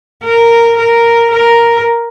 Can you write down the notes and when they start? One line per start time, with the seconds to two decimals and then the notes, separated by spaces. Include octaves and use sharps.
0.24 A#4
0.77 A#4
1.31 A#4